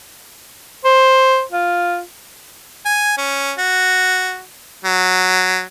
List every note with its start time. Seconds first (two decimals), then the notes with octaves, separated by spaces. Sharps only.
0.84 C5
1.52 F4
2.85 G#5
3.18 C#4
3.58 F#4
4.85 F#3